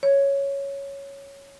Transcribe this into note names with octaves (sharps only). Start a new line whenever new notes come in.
C#5